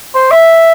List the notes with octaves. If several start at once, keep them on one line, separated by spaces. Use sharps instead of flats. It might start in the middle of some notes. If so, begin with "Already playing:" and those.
C5
E5